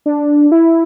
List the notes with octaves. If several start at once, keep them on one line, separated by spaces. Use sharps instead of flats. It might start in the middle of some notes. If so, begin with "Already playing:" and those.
D4
E4